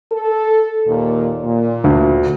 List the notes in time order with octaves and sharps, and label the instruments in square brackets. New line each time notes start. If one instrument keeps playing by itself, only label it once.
[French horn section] A4
D#2 A#2
A#2
[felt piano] D2